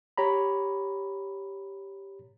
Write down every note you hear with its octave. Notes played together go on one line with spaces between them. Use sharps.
G4 C#5 A#5 B5